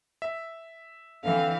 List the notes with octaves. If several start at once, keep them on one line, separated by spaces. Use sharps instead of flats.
E5
D3 E3 C4 F5